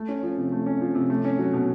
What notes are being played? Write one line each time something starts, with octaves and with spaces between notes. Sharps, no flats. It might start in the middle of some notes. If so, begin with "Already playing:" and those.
Already playing: A3
C#4
F3
C3
A3
C#4
F3
C3
A3
C#4
F#3
B2